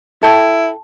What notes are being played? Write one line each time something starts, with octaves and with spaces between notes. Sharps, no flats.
E4 A4 G5 A5